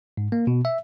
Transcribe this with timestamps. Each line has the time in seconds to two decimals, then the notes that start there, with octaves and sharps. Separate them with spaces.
0.17 G#2
0.32 A#3
0.47 B2
0.65 E5